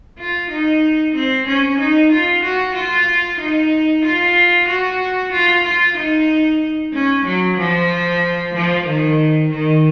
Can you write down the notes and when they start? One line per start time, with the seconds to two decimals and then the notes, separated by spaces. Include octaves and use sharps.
0.18 F4
0.50 D#4
1.15 C4
1.47 C#4
1.79 D#4
2.12 F4
2.43 F#4
2.75 F4
3.40 D#4
4.04 F4
4.68 F#4
5.32 F4
5.64 F4
5.97 D#4
6.94 C#4
7.25 F#3
7.58 F3
8.54 F3
8.86 D#3
9.50 D#3